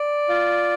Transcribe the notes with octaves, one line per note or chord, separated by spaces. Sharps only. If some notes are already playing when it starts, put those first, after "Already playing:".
Already playing: D5
F4